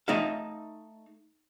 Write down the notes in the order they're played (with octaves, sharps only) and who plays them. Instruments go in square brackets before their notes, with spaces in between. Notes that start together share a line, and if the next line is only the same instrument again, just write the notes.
[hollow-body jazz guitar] A3 D#4 E5 F5